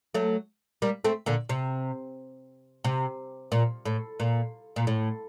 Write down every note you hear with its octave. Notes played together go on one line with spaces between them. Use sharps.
F#3 A3
G3 A#3
A3 C4
A#2 D3
C3
C3
A#2
A2
A#2
A#2
A2